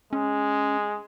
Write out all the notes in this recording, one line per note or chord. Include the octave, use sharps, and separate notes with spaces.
G#3 C#4